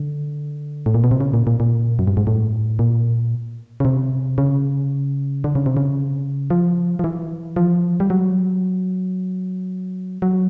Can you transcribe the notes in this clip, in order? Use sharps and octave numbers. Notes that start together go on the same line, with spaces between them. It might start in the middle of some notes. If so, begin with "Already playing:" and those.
Already playing: D3
A2
A#2
B2
C3
C#3
A#2
A#2
A#2
F#2
G2
G#2
A2
A#2
C#3
C3
C#3
D3
C#3
C3
C#3
F3
F3
E3
F3
G3
F#3
F#3